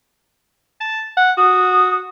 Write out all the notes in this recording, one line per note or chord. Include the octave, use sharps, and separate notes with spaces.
A5
F#5
F#4 D#6